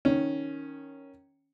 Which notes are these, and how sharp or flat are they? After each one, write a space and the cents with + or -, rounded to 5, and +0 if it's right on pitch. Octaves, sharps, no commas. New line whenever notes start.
D#3 +0 C#4 +0